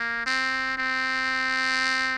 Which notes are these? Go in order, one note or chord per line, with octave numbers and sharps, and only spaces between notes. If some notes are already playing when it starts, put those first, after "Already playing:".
Already playing: A#3
C4
C4